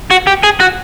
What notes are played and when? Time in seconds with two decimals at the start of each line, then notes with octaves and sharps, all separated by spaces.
0.11 F#4
0.27 G4
0.43 G#4
0.60 F#4